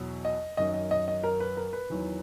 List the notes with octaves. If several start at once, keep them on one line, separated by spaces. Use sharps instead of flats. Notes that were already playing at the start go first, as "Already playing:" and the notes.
Already playing: E2 B2 F#3
D#5
F#2 D#3 F#3 D#5
D#5
D#5
D#5
A#4
B4
A#4
B4
E2 D#3 F#3